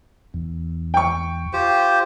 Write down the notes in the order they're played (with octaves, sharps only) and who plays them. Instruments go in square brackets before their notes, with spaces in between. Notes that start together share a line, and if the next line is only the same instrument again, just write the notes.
[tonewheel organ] E2
[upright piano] G5 C#6
[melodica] F4 G4 C5